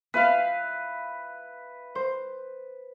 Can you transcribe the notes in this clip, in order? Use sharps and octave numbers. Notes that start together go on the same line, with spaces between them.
C4 F4 B4 E5 F5 F6
C5